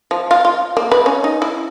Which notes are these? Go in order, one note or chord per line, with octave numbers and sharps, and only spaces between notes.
F3
F4
F4
A#3
B4
C#4
D#4
E4